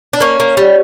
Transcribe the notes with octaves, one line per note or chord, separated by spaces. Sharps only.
D4
A#3 C#4
A#3
G3